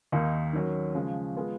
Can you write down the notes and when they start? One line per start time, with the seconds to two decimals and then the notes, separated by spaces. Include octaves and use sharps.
0.12 D#2 D#3 A#3 D#4
0.53 D#3 F#3 C#4
0.95 C#3 F3 G#3
1.36 G#3 B3 F4 G#4